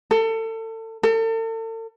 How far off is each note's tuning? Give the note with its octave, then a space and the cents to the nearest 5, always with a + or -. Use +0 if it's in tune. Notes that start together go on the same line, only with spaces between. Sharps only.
A4 +30
A4 +40